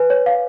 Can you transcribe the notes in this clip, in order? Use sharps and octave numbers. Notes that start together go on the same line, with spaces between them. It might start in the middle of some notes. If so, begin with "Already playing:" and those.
Already playing: B4 G#5
C#5
F5